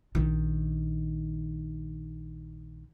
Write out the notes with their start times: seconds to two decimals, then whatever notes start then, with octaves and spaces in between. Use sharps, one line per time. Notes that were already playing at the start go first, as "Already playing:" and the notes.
0.15 A#1 D#3